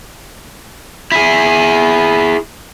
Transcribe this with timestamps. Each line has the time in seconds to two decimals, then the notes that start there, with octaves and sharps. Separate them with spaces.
1.12 E4 G#4